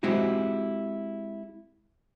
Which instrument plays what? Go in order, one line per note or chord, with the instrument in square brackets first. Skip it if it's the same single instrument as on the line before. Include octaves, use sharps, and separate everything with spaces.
[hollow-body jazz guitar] G#3 C4 E4 F#4 G4